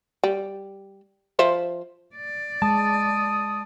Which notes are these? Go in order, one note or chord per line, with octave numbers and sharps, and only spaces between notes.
G3
F3 C5 E5
D5
G#3 A5 D#6